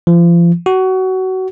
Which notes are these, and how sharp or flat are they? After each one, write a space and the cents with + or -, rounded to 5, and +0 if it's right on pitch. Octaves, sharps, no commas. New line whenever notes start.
F3 -35
F#4 +20